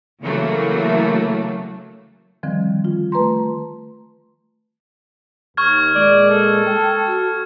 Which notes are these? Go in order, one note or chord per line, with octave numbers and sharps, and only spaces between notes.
C#3 E3 F#3 A3 A#3
D3 D#3 F3 G3 C4
F4
A3 B4 A#5 C6
D#2 C#6 F6 G#6
A#2 G#3 D5
A4
G5 A5
F#4